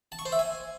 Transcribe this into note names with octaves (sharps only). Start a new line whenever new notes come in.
A5
C#6
C5
E5
G#5